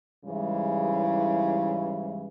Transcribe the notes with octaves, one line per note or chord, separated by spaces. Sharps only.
G#2 C#3 E3 G3 G#3 E4